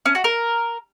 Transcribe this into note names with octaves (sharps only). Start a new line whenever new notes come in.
C#4
F#4
A#4